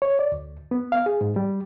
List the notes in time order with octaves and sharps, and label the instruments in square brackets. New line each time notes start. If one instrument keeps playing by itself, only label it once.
[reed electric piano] C#5
D5
D2
B3
F5
G#4
G#2
G3